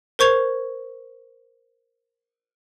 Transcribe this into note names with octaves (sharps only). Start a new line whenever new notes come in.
A#4 C5 C#6 G#6 F7